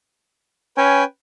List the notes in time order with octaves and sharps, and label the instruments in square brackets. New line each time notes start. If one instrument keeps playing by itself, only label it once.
[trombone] C#4 [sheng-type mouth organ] B4 G5 G#5